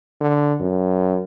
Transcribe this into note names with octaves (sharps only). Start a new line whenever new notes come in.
D3
F#2